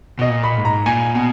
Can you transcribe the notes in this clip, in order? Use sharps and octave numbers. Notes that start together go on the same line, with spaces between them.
B2 D#5
A#2
B5
G#2
A#5
A#2 G#5
B2